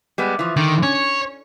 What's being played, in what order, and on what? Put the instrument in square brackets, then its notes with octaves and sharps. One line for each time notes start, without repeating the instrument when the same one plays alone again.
[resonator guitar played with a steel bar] G3 G#3 B3
E3 F3
[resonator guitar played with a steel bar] D3 [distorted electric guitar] D#3
[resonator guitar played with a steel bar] C#4 [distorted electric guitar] C#5